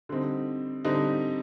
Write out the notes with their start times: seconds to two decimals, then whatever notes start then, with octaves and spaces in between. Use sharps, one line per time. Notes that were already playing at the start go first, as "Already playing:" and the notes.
0.09 D3 G3 C4 D#4
0.85 D3 G3 C4 D#4